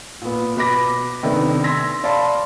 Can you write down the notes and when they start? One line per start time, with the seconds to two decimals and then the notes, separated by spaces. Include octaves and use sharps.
0.21 A#2 B3
0.57 B2 B4 B5 D6 A#6
1.23 C3 D#3 A3 B3 D4
1.64 C6 E6 G#6 A#6 B6
2.04 D5 F5 A5 B5 C6